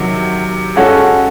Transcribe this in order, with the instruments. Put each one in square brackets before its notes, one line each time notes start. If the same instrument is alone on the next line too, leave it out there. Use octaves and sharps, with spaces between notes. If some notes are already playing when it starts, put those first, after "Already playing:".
Already playing: [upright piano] C3 D#3 F#3
G#3 C#4 F#4 A4